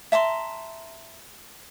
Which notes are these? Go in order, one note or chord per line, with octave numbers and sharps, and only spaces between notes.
E5 A5 A#5 C6